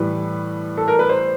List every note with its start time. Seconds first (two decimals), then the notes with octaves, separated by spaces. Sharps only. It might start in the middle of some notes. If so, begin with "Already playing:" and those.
Already playing: A2 E3 G3 B4
0.77 A4
0.88 A#4
0.99 B4
1.09 C5